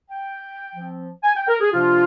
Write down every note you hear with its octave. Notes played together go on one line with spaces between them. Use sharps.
G5
F3 C4
G#5
G5
A#4
G#4
C3 F3 A#3 D4 F4